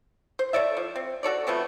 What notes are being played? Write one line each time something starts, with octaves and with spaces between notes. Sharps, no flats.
C5
A4 C#5 D5 E5
F3
C4
F#4 A4 C#5 D5
F3 A3 B3 C4